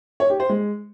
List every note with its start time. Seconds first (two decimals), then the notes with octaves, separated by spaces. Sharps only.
0.20 C#5
0.30 G4
0.40 C5
0.49 G#3